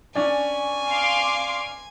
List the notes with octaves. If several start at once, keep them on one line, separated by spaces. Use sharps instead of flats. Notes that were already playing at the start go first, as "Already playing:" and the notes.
C#4 D4 G#5
F5 C6 D6